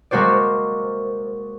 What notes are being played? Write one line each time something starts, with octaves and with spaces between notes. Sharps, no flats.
G#3 A#3 F#4 C5 D5